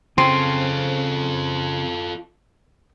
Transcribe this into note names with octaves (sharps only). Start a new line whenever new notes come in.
C#3 C4 F4 A4 C6